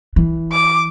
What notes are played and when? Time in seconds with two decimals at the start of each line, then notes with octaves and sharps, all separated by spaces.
0.16 E3
0.52 D6